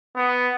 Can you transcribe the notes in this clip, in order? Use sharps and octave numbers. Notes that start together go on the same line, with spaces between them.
B3